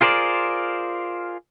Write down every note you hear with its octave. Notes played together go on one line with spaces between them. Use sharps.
F4 G#4 A#4 C5 D5